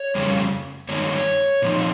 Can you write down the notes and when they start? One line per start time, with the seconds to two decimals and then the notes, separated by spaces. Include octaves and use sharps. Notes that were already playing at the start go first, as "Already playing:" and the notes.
Already playing: C#5
0.15 F2 C#3 G3 C#4
0.89 G2 D#3 G#3 D#4 C#5
1.62 A#2 F3 C4 D#4